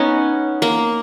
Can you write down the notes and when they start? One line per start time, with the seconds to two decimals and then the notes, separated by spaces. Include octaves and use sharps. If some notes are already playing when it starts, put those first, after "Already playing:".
Already playing: B3 C#4 D#4
0.62 A#3